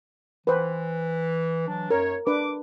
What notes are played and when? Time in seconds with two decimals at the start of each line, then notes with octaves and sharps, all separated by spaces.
0.47 E3 B4 C5
1.68 E3 F#3 D4
1.90 F#2 A#4 C#5
2.27 D4 B4 D6